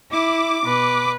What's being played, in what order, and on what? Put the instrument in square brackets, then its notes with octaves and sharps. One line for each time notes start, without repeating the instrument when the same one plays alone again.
[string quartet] E4 [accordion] D6
[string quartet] B2 [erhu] B4